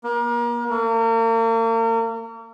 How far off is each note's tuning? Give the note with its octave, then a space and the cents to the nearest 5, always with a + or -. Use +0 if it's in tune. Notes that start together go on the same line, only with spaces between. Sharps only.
A#3 +35
A#3 -40